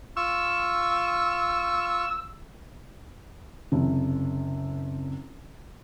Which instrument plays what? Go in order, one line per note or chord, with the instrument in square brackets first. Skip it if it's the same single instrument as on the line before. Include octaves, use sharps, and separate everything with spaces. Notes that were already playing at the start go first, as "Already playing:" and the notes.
[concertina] F4 C#6 [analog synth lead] E6
[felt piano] F#1 C3